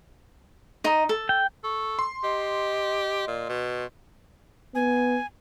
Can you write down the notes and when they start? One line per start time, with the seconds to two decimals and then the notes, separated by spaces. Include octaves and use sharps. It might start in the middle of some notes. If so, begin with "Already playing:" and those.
0.84 D#4 D#5
1.09 A4
1.29 G5
1.64 A4 C#6
1.99 C6
2.23 G4 D#5
3.27 A#2
3.49 B2
4.75 B3 G#5